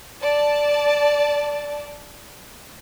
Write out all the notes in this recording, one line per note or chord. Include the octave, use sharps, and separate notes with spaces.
D5 A5